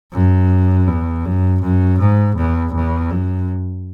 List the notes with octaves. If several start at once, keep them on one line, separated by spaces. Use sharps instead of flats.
F#2
E2
F#2
F#2
G#2
E2
E2
F#2